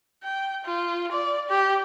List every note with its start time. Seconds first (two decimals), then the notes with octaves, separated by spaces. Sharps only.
0.24 G5
0.65 F4
1.12 D5
1.50 G4